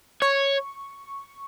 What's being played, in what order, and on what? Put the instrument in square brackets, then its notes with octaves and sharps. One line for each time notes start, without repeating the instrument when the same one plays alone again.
[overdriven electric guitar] C#5 [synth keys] C#6